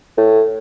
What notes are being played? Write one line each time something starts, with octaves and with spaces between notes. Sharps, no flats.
A2